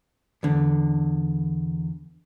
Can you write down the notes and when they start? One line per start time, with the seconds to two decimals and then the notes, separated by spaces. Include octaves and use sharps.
0.43 E2 D3